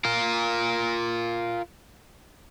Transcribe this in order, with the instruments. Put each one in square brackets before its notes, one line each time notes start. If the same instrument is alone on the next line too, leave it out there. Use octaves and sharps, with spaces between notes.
[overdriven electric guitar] F4 A#4